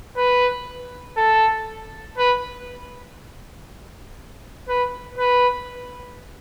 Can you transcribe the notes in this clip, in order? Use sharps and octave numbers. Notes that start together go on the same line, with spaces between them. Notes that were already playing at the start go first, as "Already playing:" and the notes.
B4
A4
B4
B4
B4